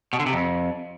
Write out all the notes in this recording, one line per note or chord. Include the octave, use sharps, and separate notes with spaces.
B2
D3
C3
F2